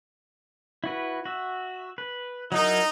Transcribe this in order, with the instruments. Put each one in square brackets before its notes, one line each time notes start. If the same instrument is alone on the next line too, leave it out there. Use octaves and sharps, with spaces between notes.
[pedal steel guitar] E4 F#4 B4
F#4 E5
B4
[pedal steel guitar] F#3 E4 A#4 [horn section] D#4